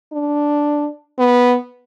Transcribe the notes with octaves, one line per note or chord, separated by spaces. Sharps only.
D4
B3